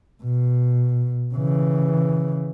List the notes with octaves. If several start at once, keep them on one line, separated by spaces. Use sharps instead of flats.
B2
C#3 E3